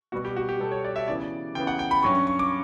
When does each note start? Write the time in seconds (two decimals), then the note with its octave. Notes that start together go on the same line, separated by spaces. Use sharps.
0.12 B2 G3 B3 F#4
0.25 G4
0.36 F#4
0.49 G4
0.60 B2 G3 B3 A4
0.71 C#5
0.85 D5
0.96 E5
1.08 C#3 E3 B3 D5
1.55 C#3 E3 B3 G5
1.67 F#5
1.79 G5
1.91 B5
2.03 G2 F#3 C#4 C#6
2.15 C#6
2.27 C#6
2.39 D6